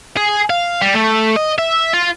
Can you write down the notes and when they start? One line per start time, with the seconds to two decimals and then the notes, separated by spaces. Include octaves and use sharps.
0.17 G#4
0.50 F5
0.82 G3
0.95 A3
1.36 D#5
1.59 E5
1.94 F4